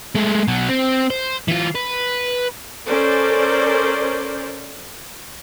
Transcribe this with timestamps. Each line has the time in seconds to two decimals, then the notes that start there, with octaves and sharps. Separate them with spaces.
0.15 G#3 A3
0.48 B2 F#3
0.69 C4
1.10 C5
1.48 E3 F4
1.75 B4
2.87 C#4 A4 A#4 C5 D5